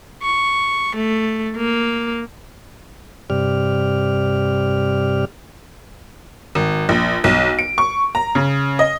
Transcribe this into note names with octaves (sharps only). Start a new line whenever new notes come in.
C#6
A3
A#3
G2 C3 G4 D5 F6
G#1
A#1
B1
D7
C#6
A#5
C#3
D#5